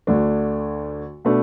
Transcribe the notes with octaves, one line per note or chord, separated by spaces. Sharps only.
D2 D3 A3 D4
B2 A3 D4